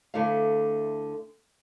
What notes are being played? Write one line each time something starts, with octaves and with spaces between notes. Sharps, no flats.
D2 D3 A3 E4 A4 F5